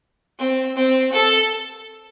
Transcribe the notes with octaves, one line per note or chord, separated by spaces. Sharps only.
C4
C4
A4